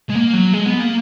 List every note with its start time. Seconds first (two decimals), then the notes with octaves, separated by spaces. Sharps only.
0.10 G#3
0.15 A#3
0.34 F#3
0.53 G#3
0.67 B3
0.80 A#3